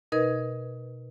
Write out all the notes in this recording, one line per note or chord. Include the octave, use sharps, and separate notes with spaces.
B2 D#4 A#4 B4 D#5 G#6